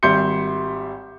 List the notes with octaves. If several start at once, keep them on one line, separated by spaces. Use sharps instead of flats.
G#1 G3 E5 C6 G6 C#7